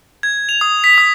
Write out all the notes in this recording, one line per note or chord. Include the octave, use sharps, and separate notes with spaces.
G#6
F7
D#6
B6
D#6